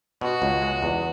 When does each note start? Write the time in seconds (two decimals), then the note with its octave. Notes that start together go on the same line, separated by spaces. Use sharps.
0.21 B2 F#4
0.42 C#2
0.62 G#3
0.83 E2